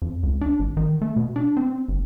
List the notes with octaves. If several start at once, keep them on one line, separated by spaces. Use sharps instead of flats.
F2
C#2
D4
G#1
D#3
A3
B2
D4
C4
G1